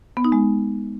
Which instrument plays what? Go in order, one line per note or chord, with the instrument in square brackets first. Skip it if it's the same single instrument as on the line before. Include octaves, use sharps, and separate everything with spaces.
[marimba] B3
D#4
G#3